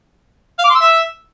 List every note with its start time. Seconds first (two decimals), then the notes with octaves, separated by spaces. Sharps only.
0.59 F5
0.64 D6
0.70 C6
0.75 E6
0.80 E5